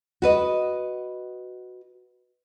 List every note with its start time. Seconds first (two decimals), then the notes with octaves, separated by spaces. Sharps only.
0.22 F#4 B4 D#5